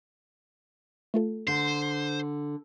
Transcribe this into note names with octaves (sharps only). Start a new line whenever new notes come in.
A3 F4 A4
D3 C5